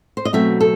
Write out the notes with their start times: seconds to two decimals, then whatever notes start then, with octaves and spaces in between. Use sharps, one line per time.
0.17 C5
0.25 D#5
0.33 B2 F#3 A3 C4 E5
0.61 A4